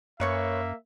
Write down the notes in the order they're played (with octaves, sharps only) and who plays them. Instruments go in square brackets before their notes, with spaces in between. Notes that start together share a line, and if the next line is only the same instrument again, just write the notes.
[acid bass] F#2 [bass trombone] A#3 [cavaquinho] B4 C#5 C#6 [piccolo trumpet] E5